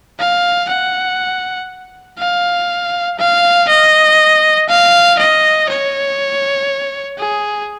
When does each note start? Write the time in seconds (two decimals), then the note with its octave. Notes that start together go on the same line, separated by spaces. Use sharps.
0.19 F5
0.69 F#5
2.19 F5
3.19 F5
3.68 D#5
4.69 F5
5.19 D#5
5.69 C#5
7.18 G#4